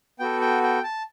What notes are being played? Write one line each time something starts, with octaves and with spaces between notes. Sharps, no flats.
B3 F#4 A4 G5
G5
G5
A5